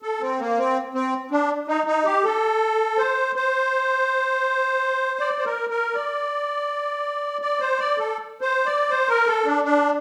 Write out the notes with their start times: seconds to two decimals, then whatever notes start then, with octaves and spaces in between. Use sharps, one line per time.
0.02 A4
0.21 C4
0.39 A#3
0.58 C4
0.94 C4
1.31 D4
1.68 D#4
1.87 D#4
2.05 G4
2.24 A4
2.98 C5
3.36 C5
5.19 D5
5.38 C5
5.45 A#4
5.70 A#4
5.94 D5
7.42 D5
7.60 C5
7.79 D5
7.98 A4
8.41 C5
8.66 D5
8.90 C5
9.09 A#4
9.27 A4
9.45 D4
9.64 D4